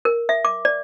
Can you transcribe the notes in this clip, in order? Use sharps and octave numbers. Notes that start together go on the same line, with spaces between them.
A#4
E5
D6
D5